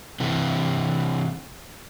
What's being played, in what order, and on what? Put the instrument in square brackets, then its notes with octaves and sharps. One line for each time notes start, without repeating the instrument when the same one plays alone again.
[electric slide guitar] C3 E3